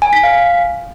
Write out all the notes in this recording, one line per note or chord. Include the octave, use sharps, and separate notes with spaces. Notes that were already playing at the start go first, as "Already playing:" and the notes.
G#5
B6
F5